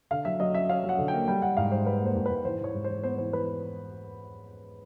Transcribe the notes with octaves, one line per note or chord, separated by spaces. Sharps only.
D3 F5
F#3 E5
F#3 D#5
C#4 E5
C#4 F5
F#3
F#5
D3
A#3 G5
G3 G5
G3 F#5
G#2 F5
G#2 C5
G3 B4
A#3 C5
G#2
G#2 B4
E3 C5
E3 C#5
G#2
E3 C5
B3 C5
E3 C5
E3 B4